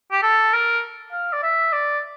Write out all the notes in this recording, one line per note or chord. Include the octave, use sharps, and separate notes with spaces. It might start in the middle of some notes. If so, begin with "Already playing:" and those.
G4
A4
A#4
F5
D5
E5
D5